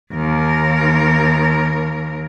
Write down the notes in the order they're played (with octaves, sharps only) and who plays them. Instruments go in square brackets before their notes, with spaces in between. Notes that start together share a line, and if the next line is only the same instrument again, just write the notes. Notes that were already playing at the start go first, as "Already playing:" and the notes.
[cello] D#2 A#4